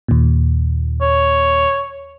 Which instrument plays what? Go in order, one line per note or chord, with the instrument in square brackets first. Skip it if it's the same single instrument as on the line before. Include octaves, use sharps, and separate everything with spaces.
[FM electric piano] D#2 A#2
[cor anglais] C#5